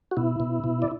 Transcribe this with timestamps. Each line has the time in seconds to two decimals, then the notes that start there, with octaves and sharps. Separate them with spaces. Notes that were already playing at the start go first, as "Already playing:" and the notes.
0.11 F#4
0.17 B2 E4
0.40 B2
0.64 B2
0.82 D5